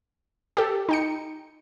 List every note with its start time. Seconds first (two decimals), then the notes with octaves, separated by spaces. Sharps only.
0.57 G4 A4
0.89 D#4 G5 C#7